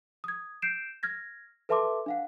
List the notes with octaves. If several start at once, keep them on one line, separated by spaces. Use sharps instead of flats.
D#6 G#6
G6 C7 D7 E7
F6 G#6 A#6
A4 B4 E5 A5 C6 D6
D4 F5 F#5